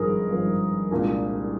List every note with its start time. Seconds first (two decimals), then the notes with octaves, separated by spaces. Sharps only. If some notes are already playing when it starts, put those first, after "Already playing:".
Already playing: G#1 G2 F3 G#4 A#4
0.30 G#1 G2 F3
0.91 C2 A#2 G#3 D4